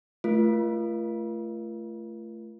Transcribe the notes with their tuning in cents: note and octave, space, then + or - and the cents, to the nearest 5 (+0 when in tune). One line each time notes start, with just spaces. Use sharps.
A3 +0 F4 -35 A#4 +40